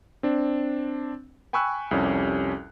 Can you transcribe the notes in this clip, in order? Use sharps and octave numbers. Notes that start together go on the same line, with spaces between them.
C4 D4
G5 G#5 B5 C#6 E6 F#6
C2 F2 G3 C#4 G4